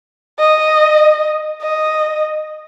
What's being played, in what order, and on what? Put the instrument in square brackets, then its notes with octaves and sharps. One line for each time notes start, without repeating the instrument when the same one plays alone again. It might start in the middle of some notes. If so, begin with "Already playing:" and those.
[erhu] D#5
D#5